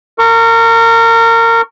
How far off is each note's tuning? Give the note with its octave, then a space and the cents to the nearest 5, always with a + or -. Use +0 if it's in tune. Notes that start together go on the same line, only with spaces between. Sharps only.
A#4 -25 C#6 +0